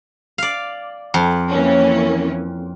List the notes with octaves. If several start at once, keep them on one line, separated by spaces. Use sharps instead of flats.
D5 F5
F2
E3 A#3 C#4